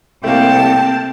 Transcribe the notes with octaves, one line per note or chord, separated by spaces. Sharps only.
C2 C3 A3 A#3 G5 A5